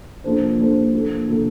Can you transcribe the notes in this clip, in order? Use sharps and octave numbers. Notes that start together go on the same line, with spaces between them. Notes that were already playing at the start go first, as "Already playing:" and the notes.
F3 A#3 D4 A4 C5
F3 A#3 D4 A4 C5
F3 A#3 D4 A4
F3 A#3 D4 A4